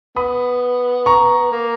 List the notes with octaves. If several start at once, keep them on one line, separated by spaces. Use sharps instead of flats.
B3 B5 D#6
A#5 C#6
A#3